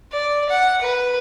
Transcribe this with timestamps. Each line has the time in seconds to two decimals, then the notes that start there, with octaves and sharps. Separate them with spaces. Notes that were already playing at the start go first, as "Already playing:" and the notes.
0.12 D5
0.50 F#5
0.81 B4